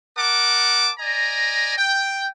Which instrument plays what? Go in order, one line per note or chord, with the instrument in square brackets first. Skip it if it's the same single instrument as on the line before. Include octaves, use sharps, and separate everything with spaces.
[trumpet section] A#4 F#5 A5 D6
D5 D#5 G#5 A#5
G5